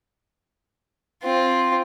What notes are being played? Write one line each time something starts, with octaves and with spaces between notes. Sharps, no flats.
C4 F4